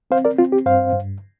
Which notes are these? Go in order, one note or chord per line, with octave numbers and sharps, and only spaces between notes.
C4 C5 F5
A#4 D5
C4 F4
G4
G2 C5 F5
G2